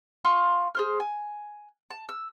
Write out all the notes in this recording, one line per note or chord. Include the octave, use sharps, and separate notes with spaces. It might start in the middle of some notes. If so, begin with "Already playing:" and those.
F4 C6 C#6
G#4 C5 F6
G#5
A5
E6